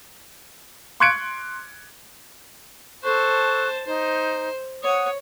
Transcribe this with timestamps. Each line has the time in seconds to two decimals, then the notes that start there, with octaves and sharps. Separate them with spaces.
1.00 C6 C#6 F#6 G#6 C#7 D7
3.03 A4 C5 A5 C#6 F#6
3.86 D#4 C5
4.83 C#5 F#5 D#6